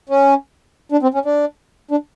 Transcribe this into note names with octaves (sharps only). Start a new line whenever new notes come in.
C#4
D4
C4
C#4
D4
D4